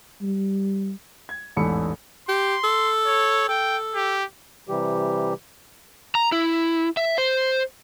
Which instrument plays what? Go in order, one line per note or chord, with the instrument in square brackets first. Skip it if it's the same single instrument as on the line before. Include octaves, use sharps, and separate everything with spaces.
[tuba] G3
[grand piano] G#6
A1 E2 G#2 A4 B5 C#7
[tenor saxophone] G4 [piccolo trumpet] C6
[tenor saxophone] A4
[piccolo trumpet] C#5
[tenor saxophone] A4 [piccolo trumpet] G5
[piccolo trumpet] G4
[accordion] C3 E3 G3 G4
[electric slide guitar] A#5
E4
E5
C5